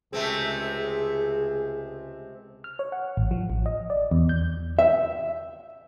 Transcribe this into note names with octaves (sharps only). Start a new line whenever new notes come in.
C#2 C3 A3 C4 G#4
F6
C#5
F#5
A1
F3
A1
D#5
D5
E2
G6
E5